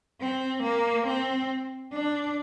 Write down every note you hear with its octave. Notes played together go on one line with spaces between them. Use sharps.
C4
A#3
C4
D4